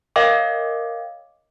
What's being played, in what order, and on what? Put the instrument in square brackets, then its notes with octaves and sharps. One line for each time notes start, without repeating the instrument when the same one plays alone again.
[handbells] A#4 C#5 D#5 F5 G5 D6